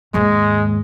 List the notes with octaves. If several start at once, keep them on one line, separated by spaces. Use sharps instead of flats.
D#2 G#2 G#3